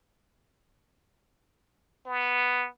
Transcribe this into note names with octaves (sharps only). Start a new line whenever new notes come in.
B3